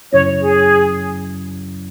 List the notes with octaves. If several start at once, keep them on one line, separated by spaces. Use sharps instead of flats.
F#2 C#3 F#3 C#4 E4 C#5
G#4